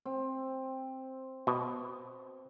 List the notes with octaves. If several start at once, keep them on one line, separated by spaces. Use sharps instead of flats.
C4
B2